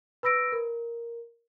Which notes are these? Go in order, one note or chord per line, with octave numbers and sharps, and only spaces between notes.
B4 B5 E6 A#6 D7
A#4